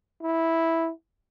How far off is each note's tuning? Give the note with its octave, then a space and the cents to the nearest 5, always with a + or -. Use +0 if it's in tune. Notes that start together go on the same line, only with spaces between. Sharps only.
E4 -5